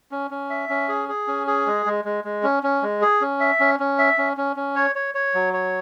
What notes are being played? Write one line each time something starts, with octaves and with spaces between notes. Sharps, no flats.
C#4
C#4
E5
C#4
G#4
G#4
C#4
G#4
G#3
G#3
G#3
G#3
C#4
C#4
G#3
G#4
C#4
E5
C#4
C#4
E5
C#4
C#4
C#4
C#5
C#5
C#5
F#3
C#5